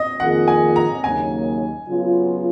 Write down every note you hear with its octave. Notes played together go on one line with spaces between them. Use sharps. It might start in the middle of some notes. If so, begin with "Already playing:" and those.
Already playing: D#5
F2 D#3 A#3 F4 G#4 F#5
G#5
A#5
D#2 C#3 F#3 A#3 D#4 G#5
C#3 F#3 B3 F4